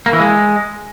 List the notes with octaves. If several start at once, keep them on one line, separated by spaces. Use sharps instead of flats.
A#3
E3
G#3